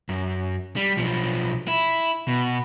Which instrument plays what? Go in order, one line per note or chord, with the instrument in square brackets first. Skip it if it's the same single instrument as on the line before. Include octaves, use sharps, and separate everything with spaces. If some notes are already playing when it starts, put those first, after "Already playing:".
[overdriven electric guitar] F#2
G3
B1 F3
E4
B2